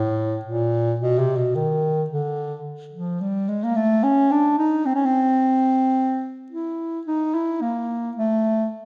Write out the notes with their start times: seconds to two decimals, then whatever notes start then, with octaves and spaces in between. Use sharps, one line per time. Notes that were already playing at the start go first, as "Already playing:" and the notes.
Already playing: A2
0.45 A#2
1.00 B2
1.19 C3
1.37 B2
1.55 D#3
2.10 D3
2.93 F3
3.21 G3
3.48 G#3
3.64 A#3
3.76 A3
4.03 C#4
4.31 D4
4.58 D#4
4.86 C4
4.95 C#4
5.05 C4
6.52 E4
7.07 D#4
7.35 E4
7.62 A#3
8.17 A3